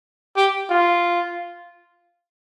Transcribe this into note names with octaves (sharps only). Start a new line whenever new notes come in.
G4
F4